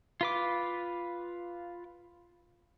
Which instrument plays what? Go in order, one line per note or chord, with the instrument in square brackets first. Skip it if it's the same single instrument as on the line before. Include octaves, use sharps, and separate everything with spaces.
[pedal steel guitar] F4 B4 D6